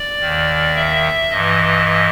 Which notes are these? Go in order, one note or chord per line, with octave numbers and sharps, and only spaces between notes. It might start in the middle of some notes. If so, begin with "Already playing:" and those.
Already playing: D5
D#2 D#3
E5
G2 E3 D#5